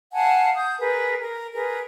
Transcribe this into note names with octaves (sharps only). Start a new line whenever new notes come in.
F5 F#5 G#5 A5
D#6 G6
G#4 A#4 B4
A#4
G#4 A#4 B4